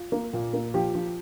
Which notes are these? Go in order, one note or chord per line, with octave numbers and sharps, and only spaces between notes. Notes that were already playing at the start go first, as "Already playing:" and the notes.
Already playing: F4
A#3
A#2
A#3
F3 G4
F3